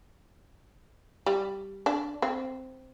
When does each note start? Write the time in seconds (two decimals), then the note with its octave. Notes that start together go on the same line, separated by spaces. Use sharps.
1.26 G3
1.86 D4
2.22 C4